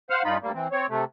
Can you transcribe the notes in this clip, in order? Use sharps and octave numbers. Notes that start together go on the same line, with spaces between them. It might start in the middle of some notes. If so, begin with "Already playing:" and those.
C5 F5 F#5 F6
G2 D#4 F4 B5
D2 G3 A#3
E3 C4
C4 C#5
C3 A3